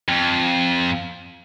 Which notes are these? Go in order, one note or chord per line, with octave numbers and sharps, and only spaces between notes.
F2